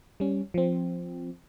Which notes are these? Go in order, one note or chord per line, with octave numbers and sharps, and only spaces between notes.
G3 C#4
F3 C4